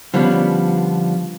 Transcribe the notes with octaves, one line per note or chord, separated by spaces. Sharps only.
D3 F3 G3 B3 C#4 D4